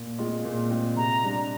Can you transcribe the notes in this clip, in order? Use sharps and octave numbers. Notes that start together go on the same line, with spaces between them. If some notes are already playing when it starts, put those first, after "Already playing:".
Already playing: A#2
G#3 C4 F4
A#2
G#3 C4 F4
C3 A#5
G3 D4